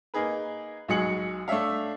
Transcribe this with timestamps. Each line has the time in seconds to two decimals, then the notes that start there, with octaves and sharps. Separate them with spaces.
0.14 A#3 D#4 G#4 B4
0.88 B1 F#3 G#3 G#4 C#7 F#7
1.48 A3 D4 C#5 E5 F5